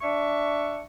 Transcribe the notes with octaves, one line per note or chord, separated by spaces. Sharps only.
D4 E5 C#6